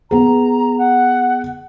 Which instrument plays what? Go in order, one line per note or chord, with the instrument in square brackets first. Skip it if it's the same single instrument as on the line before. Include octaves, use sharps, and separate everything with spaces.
[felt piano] B3 G#4 [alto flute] A#5
[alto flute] F#5